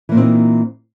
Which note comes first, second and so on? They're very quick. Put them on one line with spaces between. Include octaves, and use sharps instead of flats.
E3 A#3 A#2 C4 D#4